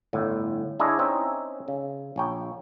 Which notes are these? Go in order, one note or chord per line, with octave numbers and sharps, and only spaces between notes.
G1 A2
D4 E4 G#4 C#5 D#5
C4 C#4 D#4 E5
C#3
A#1 C#5 G5